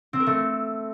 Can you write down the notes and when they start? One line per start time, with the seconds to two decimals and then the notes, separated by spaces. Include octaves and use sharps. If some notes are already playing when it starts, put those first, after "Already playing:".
0.13 C4
0.20 A#4
0.27 A3